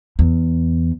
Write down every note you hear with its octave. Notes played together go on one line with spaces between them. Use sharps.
E2